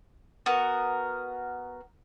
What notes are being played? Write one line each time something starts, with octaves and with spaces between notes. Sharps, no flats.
B3 F#4 A#4